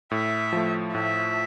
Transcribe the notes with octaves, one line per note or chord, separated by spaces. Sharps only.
A2 E5
F3 A3
A2 E5